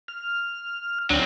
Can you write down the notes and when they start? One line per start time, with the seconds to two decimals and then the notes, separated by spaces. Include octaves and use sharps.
0.08 F6
1.10 D2 F#3 C4 D4